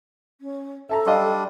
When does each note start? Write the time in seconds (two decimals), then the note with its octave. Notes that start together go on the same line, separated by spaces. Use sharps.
0.41 C#4
0.89 A4 E5 A5 A#5
1.06 G3 D4 D#5 F5 C6